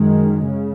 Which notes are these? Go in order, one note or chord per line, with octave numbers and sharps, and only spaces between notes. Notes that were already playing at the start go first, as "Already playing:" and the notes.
Already playing: F#2 D#3 G#3
C#3